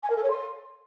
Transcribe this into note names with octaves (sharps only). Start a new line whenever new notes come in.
G#5
A#4
A4
C#5
C6